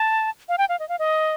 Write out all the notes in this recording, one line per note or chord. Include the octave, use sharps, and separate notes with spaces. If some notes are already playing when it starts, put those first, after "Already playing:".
Already playing: A5
F5
G5
F5
D#5
F5
D#5